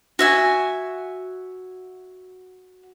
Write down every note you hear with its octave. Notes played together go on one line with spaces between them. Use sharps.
F#4 E5 G#5